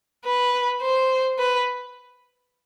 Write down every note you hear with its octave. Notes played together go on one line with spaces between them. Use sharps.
B4
C5
B4